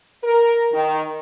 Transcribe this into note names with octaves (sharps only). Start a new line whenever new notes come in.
A#4
D#3